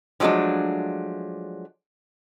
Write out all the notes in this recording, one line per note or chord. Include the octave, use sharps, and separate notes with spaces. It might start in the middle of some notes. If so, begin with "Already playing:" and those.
F3 F#3 G#3 A3 D4